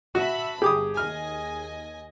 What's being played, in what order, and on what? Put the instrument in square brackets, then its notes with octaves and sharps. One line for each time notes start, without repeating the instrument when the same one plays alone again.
[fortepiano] F#4 [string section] E5 A5 B5
[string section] G1 [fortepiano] G4 D6 D#6 [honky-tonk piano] G#4
[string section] D#2 D#5 G#5 [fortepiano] F6